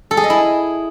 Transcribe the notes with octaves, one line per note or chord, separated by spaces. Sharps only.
A4
G#4
D#5
E4